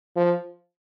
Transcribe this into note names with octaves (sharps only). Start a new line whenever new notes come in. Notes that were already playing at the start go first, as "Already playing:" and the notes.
F3